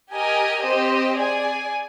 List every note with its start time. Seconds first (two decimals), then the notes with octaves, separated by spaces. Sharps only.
0.12 G4 A#4 D#5 G#5
0.64 C4 G4 C5 D#5
1.17 G#4 D5 G#5